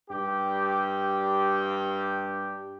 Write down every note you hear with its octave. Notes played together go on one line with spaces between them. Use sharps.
G2 G4